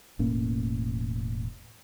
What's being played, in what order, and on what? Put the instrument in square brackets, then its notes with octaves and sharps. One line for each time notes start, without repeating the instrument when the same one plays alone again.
[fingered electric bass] E1 A2 A#3 C#4